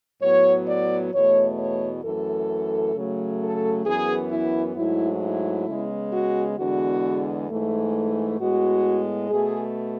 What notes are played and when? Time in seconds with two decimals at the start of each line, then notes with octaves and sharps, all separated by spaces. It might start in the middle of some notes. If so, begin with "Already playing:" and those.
0.23 A2 F#3 B3 C#5
0.68 D5
1.14 E2 B2 A3 C#5
1.59 C#5
2.05 F#2 E3 A3 A4
2.95 C#3 F#3 A3
3.41 A4
3.86 F#2 E3 B3 G#4
4.31 E4
4.77 G#2 F#3 A3 E4
5.22 E4
5.68 C#3 G#3 B3
6.13 F#4
6.58 E2 D3 G#3 B3 F#4
7.49 G#2 E3 A3
8.40 A2 G#3 B3 F#4
9.30 B2 A3 G#4